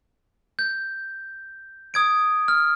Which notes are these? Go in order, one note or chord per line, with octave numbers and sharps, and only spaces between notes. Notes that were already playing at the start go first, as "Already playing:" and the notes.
G6
D#6 G#6 D7
F6